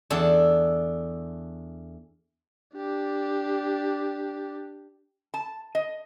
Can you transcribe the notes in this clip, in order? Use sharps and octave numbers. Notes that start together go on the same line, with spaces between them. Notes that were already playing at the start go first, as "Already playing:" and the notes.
E2 D4 A4
D4 G4
A5
D#5